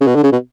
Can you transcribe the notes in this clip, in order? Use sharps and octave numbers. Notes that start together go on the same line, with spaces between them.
C#3
B2
D3
C#3
B2